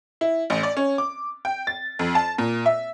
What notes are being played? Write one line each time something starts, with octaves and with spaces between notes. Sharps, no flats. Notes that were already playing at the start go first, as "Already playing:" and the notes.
E4
A1
D5
C#4
D6
G5
A6
F2
A5
A#2
E5